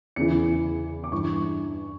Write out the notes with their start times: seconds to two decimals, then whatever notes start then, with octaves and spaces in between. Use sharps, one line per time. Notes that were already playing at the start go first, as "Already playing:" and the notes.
0.16 E2 C#3 E3 C#7
1.04 D6
1.12 G2 E3 C#6